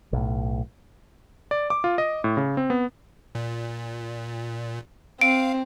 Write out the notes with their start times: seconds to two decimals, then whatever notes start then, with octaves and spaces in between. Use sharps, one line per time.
0.13 B1 A2
1.51 D5
1.70 D6
1.84 F4
1.98 D#5
2.24 A2
2.37 C#3
2.57 C4
2.70 B3
3.35 A#2
5.21 C4 F5 D7